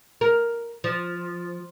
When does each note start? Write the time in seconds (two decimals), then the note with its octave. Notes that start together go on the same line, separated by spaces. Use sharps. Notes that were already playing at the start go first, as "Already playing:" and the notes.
0.21 A#4
0.84 F3